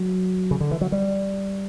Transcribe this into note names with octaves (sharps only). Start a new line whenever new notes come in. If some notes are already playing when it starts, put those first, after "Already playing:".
Already playing: F#3
C#3
D3
E3
F#3
G3